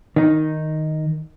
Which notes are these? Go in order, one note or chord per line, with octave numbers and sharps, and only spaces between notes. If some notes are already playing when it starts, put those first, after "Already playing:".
D#3 D#4